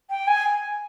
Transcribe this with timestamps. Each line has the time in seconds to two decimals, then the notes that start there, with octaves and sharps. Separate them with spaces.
0.10 G5
0.27 G#5